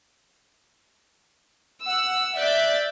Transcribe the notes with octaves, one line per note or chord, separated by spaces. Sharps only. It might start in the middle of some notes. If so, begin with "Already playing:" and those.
F#5 E6
D5 E5 F#6 G6 A6 B6